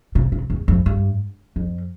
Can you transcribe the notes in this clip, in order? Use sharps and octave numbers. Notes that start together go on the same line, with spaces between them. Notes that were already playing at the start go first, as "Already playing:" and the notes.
C3
C3
E2
F2
G2
F2